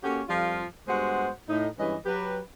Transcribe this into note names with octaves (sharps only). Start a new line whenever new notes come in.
A#3 C#4 F#4 G4 A4 C#5
F2 F3 G3 F4
G2 G#3 B3 F#4 C5 F#5
A2 D#4
G2 E3 G#3 C#4 B4 D#5
F#3 G4 B4